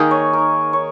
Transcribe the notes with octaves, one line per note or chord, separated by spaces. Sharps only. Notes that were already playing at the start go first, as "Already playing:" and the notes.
Already playing: D#3 A#3 D#4 G#4
C#5
A#4
C#5